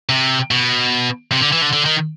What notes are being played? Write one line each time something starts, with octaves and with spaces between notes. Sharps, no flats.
C3
B2
C3
D3
E3
D3
D3
D#3